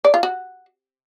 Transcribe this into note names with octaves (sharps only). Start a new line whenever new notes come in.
D5
F4
F#4